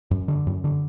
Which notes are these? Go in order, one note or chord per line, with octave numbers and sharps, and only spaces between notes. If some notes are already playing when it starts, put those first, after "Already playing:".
F#2
D3
F#2
D3